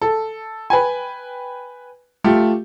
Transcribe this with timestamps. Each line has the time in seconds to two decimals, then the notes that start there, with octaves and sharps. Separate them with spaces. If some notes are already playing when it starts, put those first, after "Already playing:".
0.02 A4
0.70 B4 G5 G#5
2.24 A3 F4 G4